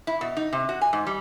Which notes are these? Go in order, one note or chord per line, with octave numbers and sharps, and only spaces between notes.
E4
B2
D#4
C3
F#4
G#5
G#2
G3